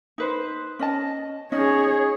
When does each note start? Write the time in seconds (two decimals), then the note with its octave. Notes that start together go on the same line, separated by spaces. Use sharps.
0.18 D#4 B4 C5
0.79 C#4 D#5 A5
1.52 C#4 D#4 G#4 C#5 D#5